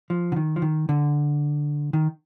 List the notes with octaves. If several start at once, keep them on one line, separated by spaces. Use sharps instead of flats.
F3
D3
D#3
F3
D#3
D3
D#3